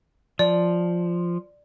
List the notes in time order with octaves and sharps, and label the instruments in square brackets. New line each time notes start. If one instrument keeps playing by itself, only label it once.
[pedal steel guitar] F3 [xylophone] D5